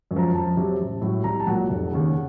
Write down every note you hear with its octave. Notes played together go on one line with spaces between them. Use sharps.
F#2
F3 A#5
F2 A5
C3 F#3
A1
A2 F#3
C2 A#5
A5
A#2 F#3 F#5
F1
D#2 C#3